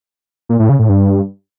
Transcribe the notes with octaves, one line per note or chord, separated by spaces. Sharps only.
A#2
A2
C#3
A2
G2